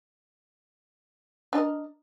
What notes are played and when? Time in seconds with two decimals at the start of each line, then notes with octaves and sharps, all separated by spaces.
1.53 D4
1.55 D#5
1.58 A#4